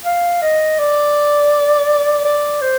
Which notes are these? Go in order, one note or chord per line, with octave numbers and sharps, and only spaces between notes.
F5
D#5
D5
D5
C5